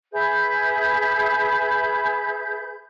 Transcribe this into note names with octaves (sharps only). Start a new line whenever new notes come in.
G#4 B4 E5 G6